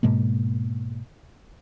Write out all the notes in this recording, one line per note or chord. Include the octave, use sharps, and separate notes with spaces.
G#2 B2 G#3 A#3